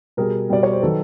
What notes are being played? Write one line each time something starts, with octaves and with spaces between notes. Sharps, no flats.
B2 G3 G#4 A#4
B2 G3 D5
C#5
C5
D#3 F#3 A4 B4